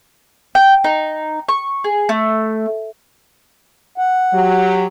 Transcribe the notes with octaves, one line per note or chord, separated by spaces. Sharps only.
G5
D#4
C#6
G#4
A3
F#5
F#3 G4